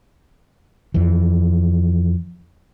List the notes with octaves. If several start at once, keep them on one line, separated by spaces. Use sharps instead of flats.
F2 E3